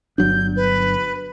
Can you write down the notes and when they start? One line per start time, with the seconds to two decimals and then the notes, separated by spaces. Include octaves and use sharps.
0.18 G1 F#3 D4 G6
0.56 B4